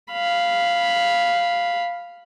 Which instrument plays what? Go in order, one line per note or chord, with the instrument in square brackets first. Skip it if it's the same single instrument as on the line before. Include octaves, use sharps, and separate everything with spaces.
[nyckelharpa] F5 B5